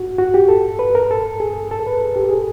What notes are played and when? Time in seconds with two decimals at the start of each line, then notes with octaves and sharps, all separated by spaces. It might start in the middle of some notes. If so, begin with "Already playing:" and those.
Already playing: F#4
0.18 F#4
0.34 G4
0.49 A4
0.79 B4
0.95 A#4
1.11 A4
1.40 G#4
1.71 A4
1.80 A#4
1.86 B4
2.01 G#4
2.16 G4
2.29 G#4